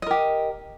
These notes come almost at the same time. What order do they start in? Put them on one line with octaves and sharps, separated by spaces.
D#5 A#4 G4